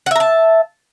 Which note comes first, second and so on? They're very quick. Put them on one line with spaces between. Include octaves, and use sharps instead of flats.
F#5 E5 A#5 A5